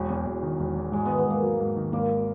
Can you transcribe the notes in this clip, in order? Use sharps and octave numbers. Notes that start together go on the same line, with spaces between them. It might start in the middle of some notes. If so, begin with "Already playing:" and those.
Already playing: E1 F#3
E2
E1
D#3
E1
E2
G#2 G#3
D#3 B3
B3
G#2 A#3
F#3
G#2
D#3
G#1 A#3